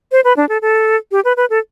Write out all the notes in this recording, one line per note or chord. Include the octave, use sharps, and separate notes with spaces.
C5
B4
D4
A4
A4
G4
B4
B4
A4